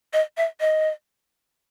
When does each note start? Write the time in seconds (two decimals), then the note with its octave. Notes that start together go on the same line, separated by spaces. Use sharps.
0.13 D#5
0.37 E5
0.60 D#5